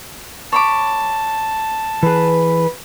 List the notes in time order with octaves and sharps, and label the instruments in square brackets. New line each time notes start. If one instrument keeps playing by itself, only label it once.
[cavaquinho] C#5 B5 D6 [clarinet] A5
[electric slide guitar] E3 G#4 [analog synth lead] B4